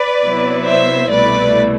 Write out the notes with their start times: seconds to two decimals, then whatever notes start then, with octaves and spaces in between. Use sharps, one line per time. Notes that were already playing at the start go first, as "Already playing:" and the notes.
Already playing: B4 D5
0.21 C3 F#3 B3 E4
0.66 C5 E5
1.11 C2 B2 A3 E4 B4 D5